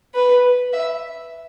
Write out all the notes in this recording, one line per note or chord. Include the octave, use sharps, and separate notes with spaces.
B4
E5